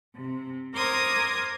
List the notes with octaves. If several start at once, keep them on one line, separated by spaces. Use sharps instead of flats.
C3
A#4 C5 D6 D#6 G#6